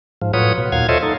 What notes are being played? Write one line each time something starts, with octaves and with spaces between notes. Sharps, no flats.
G#2 F3
A2 F#3 F4 B4 C#5 D#6
B2
D#2 A#2 F#3 F5 G#6
F4 A4 C5 C#5 D#5 E5
D#4 A4